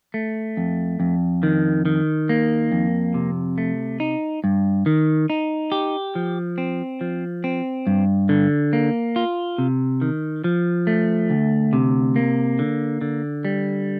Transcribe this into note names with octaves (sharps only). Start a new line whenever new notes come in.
A3
F2
F2
D#3
D#3
A#3
F2
C3
A3
D#4
G2
D#3
D#4
G4
F3
C4
F3
C4
G2
D3
A#3
F4
C3
D#3
F3
A3
D2
C3
A#3
D3
D3
G3